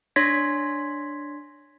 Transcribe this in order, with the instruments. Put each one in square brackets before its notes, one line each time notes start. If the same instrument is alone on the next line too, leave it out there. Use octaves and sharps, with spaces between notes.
[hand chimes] D4 C#5 C6 G#6 A#6 B6